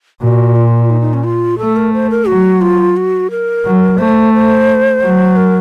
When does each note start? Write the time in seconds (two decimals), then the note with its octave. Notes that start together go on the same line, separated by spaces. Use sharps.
0.21 A#2 F#4
0.56 F4
0.90 D#4
1.01 D#4
1.14 C#4
1.24 F4
1.58 A3 A4
1.76 A#4
1.93 C5
2.10 A#4
2.27 F#3 F#4
2.61 F4
2.97 F#4
3.31 A#4
3.65 F#3
3.98 A3 C5
4.34 C5
5.02 F#3
5.36 A#4